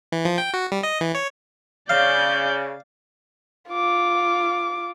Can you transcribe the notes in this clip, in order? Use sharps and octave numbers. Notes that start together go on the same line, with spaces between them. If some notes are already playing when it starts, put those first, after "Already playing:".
E3
F3
G5
F#4
G3
D#5
E3
C#5
C#3 D5 F5 G6
F4 D6